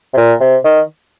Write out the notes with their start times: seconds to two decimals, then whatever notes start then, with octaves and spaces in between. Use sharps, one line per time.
0.14 C3
0.17 A#2
0.40 C3
0.64 D#3